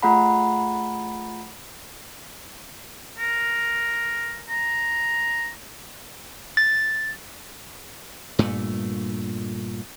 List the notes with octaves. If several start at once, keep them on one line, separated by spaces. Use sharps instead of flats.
A3 F4 G#4 F#5 A#5 B5
A#4
A#5
A6
G2 A#2 A3